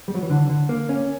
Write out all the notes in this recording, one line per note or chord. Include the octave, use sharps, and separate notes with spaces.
G3
F#3
E3
D3
D3
A#3
C#4